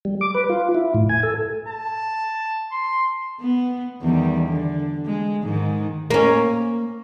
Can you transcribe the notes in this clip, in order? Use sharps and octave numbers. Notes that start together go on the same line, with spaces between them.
G3
D6
B4
F4
E4
A2
G#5
A4
A5
C6
B3
E2 D#3 G3
D3
G#3
G#2 D#3
A#3 C#4